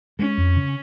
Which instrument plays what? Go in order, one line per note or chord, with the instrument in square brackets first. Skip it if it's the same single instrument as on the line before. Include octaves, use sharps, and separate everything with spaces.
[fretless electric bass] G#3 [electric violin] C#4
[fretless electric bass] F2
C#3